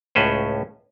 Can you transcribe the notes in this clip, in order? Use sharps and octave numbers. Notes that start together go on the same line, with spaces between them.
C#2 A2 C#4 B4 C5